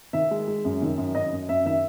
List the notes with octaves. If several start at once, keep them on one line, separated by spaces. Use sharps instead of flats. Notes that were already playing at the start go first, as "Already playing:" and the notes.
D#3 E5
G#3
G#3
F#2
D#3
F#2
F#2 D#5
F#2
F#2 E5
D#3 E5